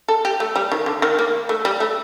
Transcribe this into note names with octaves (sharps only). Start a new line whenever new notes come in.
A4
G4
A3
G3
D#3
D3
D#3
A#3
A3
G3
A3